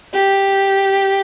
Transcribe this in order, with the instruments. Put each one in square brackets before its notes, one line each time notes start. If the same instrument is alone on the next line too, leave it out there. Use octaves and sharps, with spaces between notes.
[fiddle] G4